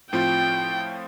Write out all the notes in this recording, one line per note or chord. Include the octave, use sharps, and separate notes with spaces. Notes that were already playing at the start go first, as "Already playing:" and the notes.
A2 F3 C4 F4 G5